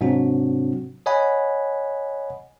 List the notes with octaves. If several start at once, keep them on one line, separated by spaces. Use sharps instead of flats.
G#2 C3 F#3 C4 D4 F#4
C#5 D#5 F#5 G#5 B5